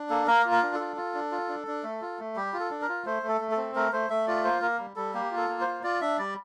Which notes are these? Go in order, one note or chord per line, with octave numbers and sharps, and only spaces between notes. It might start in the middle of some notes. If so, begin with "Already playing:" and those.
Already playing: D4
A#3 A4
A#3 A#4
F4
A#4
D4
F4 A4
F4
D4
F4
D4
D4
A3
F4
A3
G3 G4
F4
A4
D4
A#4
F4
A3 C5
A3
A4
A3
A4
C4
A3 A#4
A3 C5
A3 E5
F4 D5
A#3 C5
A#3 A#4
G3
G3 A4
A#3 G4
F4
A4
A#3
C5
F4
F4 D5
D4 E5
G3 D5